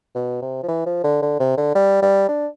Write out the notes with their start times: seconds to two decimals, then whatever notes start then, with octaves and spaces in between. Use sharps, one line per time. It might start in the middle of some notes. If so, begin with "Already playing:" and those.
0.15 B2
0.42 C3
0.63 F3
0.68 E3
0.86 F3
1.04 D3
1.22 D3
1.40 C3
1.57 D3
1.75 G3
2.02 G3
2.29 D4